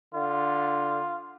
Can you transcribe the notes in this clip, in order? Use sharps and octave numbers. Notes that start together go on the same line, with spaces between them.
D3 F4